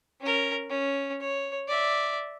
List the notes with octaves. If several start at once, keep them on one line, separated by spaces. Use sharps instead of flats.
C#4 A#4
C#4
C#5
D5 E5